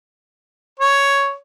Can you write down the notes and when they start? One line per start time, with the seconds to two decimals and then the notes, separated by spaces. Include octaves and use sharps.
0.79 C#5